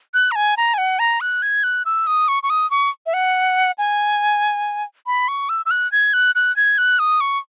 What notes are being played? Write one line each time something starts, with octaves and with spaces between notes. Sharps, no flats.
F#6
A#5
G#5
A#5
G#5
F#5
A#5
F#6
G#6
F#6
E6
D#6
C#6
C#6
D#6
C#6
E5
F#5
G#5
B5
C#6
E6
E6
F#6
G#6
F#6
F#6
G#6
F#6
D#6
C#6